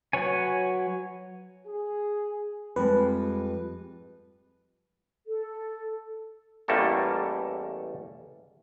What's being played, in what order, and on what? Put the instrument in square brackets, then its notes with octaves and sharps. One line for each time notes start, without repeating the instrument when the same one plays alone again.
[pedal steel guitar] F#3 B4 C#5 G#5
[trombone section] G#4
[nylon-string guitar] F2 G3 G#3 [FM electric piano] B4
[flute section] A4
[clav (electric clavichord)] A1 E2 G3 A3 A#3 A4